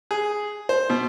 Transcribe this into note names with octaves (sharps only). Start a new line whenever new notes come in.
G#4
C5
B2